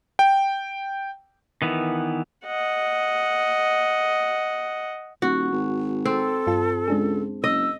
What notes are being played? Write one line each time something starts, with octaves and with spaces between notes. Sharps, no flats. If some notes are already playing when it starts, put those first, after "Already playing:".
G5
D#3 E3 B3
D#5 F#5
D#1 F#4
G#1
C4 A4
G2 F4 A5
C#2 G#3 D4 G#4
F#1 D#5 E6